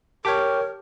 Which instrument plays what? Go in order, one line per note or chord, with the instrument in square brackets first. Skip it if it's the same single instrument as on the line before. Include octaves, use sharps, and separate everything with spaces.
[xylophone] G4 A5 B6 [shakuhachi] A#4 [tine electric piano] C#5 G5 D6